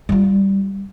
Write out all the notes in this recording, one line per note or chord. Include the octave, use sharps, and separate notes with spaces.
G3 F4